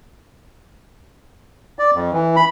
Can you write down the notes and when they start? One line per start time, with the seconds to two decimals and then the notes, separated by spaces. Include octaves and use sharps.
1.79 D5
1.95 F2
2.12 E3
2.36 B5